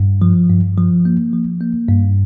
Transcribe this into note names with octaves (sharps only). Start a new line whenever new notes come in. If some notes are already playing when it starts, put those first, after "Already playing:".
Already playing: G2
F3
G2
F3
A#3
F3
A#3
G2